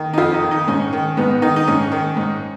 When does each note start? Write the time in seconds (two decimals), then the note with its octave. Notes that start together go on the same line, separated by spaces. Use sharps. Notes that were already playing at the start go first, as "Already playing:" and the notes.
Already playing: D#3
0.13 D#4
0.18 F2 F4
0.34 D#4
0.43 D#3
0.51 D#4
0.67 G#2 C#4
0.93 D#3
1.17 G#2 B3
1.42 D#3 D#4
1.56 D#4
1.67 G#2 C#4
1.92 D#3
2.17 G#2